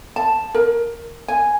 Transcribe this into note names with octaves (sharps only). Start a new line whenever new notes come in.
A5
A#4
G#5